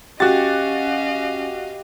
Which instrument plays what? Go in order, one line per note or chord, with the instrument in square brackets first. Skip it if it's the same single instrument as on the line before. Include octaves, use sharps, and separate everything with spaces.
[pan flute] C#4 [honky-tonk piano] F#4 A6 [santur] G4 [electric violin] D#5 F5